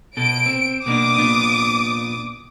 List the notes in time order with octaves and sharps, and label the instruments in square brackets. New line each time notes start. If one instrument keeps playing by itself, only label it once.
[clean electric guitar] B2 A4 [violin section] D7
[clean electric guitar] C4
[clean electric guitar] B2 A#3 D4 [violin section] D6 D#6
[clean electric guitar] A#2 B3 D4